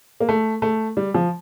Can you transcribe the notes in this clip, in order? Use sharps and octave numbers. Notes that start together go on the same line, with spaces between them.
A#3
A3
A3
G3
F3